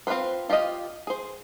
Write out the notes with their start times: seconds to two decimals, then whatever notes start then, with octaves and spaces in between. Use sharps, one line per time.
0.07 C4 F4 G#4 B4 C5
0.50 F4 G4 D5 D#5 F5
1.07 G#4 C5